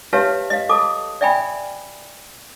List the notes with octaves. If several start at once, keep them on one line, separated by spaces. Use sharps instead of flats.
G4 B4 C#5 E5 F5 A5
D#5 F5
A4 A5 D6 D#6
D5 E5 G5 G#5 B5